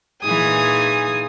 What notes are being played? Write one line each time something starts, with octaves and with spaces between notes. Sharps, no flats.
A#2 E3 D#4 G#4 G#5 D#6